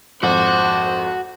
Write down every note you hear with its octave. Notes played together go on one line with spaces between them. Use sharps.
G#1 F2 D4 F#4 C5 F#5 F#7